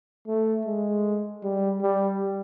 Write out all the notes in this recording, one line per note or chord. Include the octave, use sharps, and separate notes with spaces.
A3
G#3
G3
G3